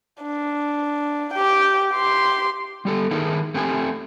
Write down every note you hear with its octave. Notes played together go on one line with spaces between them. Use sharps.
D4
G4 G5
G4 C6
G3 G4 A4
D#3 D#4 E4 G#4 A#4
A3 C4 G4 F5 G#5